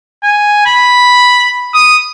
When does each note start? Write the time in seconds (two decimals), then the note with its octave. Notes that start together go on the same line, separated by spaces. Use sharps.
0.23 G#5
0.66 B5
1.74 D#6